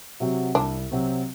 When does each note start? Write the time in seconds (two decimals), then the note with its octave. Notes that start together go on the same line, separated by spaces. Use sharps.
0.20 C3 F#3 C4 F#4
0.55 C2 D4
0.91 C3 F#3 C4 F#4